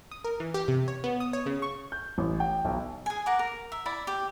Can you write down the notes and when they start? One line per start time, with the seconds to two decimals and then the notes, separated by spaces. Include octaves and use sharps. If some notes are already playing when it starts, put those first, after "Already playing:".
0.11 D#6
0.25 A#4
0.40 E3
0.54 G4
0.68 C3
0.88 C#5
1.04 B3
1.20 D#6
1.33 C#5
1.46 C#3
1.62 C#6
1.92 G6
2.18 A1
2.40 G5
2.65 B1
3.06 G#4 G#5
3.26 A#4 F#5 D6
3.39 A#4
3.72 E5
3.86 E4 D5 B5
4.07 G4